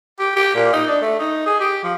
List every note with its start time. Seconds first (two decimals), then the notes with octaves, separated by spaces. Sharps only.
0.19 G4
0.36 G4
0.55 A#2
0.73 D#4
0.87 D4
1.02 A3
1.19 D#4
1.46 G#4
1.60 G4
1.83 F3